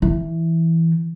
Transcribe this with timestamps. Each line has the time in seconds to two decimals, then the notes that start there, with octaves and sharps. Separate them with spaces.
0.02 E3